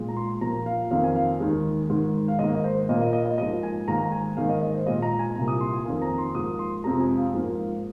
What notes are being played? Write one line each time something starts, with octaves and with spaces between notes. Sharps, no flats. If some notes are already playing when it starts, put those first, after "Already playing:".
Already playing: A#2 G#3
A#5
C6
A#2 F3 A#3 A#5
F5
F2 D#3 A#3 F5
G#5
F5
D#2 D#3 G#3
G#2 D#3 G#3
F5
G#2 D#3 A#3 D#5
D#5
C5
A#2 A#3 D#5
D#5
D#5
D#5
G#2 F3 A#3 D#5
G#5
G#2 D#3 A#3 A#5
A#5
G#5
G#2 D#3 A#3 F5
D#5
D#5
C5
A#2 G#3 D#5
A#5
G#5
C2 A#2 A#3 A#5
D#6
C6
G#5
F2 D#3 A#3 G#5
A#5
C6
G#2 F3 A#3 D#6
C6
F2 C3 F3 G#3 A#5
G#5
F5
G#2 F3 A#3